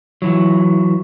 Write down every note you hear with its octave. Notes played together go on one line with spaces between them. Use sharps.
E3 F#3